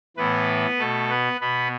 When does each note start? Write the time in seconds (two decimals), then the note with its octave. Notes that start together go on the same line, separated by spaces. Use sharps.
0.17 A2 E3 B3 B4
0.79 B2 A3 A4
1.10 B3 B4
1.40 B2 B3 B4